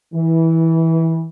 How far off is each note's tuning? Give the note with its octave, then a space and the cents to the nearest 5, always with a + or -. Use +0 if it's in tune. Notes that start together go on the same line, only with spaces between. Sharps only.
E3 -15